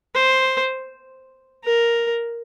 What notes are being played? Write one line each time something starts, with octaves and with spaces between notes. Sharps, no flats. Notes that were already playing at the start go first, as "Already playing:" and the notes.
C5
A#4